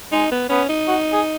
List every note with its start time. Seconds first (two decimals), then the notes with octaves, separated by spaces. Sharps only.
0.12 G#3 D#4
0.32 B3
0.49 B3 C#4
0.69 D#4
0.88 F#4
1.12 G#4